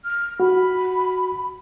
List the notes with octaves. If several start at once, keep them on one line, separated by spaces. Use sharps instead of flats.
F6
F#4 B5